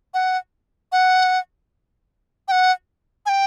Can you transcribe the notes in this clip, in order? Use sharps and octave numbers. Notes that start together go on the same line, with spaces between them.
F#5
F#5
G5
F#5
G#5
G5